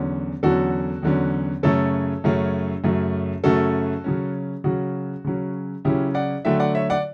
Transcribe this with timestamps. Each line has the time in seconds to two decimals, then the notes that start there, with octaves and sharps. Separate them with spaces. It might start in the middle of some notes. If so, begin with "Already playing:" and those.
Already playing: E2 D3 F#3 C#4
0.43 E2 D3 F#3 C#4 F#4 A4
1.03 E2 D3 F#3 C#4
1.63 F#2 C#3 F#3 A3 C#4 A4 C#5
2.24 F#2 C#3 F#3 A3 C#4
2.84 F#2 C#3 F#3 A3 C#4
3.44 F#2 C#3 F#3 A3 C#4 F#4 A4
4.04 C#3 F#3 C#4
4.64 C#3 F#3 C#4 F#4
5.24 C#3 F#3 C#4
5.85 C#3 F#3 C#4 E4 G4
6.14 D5 F#5
6.45 D3 F#3 A3 E5 G5
6.59 D5 F#5
6.75 C#5 E5
6.90 D5 F#5